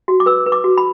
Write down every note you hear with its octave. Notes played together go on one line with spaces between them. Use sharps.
F#4
D6
B4 E6
B4
D6
F#4
B5